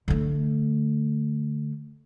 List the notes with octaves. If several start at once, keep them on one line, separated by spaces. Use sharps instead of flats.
D3 A3